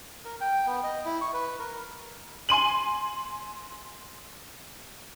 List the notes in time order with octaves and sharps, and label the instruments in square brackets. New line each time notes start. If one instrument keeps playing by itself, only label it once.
[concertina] A#4
G5
B3
D#5
E4
C#6
B4
A#4
[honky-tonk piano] G#5 C6 D#7 F#7